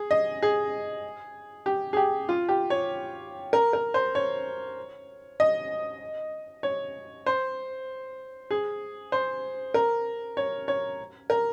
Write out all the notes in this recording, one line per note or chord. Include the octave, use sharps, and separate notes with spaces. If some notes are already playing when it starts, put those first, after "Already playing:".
Already playing: G#4
D#5
G#4
G4
G#4
G4
F4
G4
C#5
A#4
A#4
C5
C#5
D#5
C#5
C5
G#4
C5
A#4
C#5
C#5
A#4